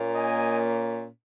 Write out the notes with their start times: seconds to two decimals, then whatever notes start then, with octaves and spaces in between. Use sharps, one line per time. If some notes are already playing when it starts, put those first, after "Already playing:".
Already playing: A#2 A#3 C#4
0.15 D#5 G#5